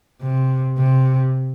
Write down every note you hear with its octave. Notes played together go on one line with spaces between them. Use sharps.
C3
C3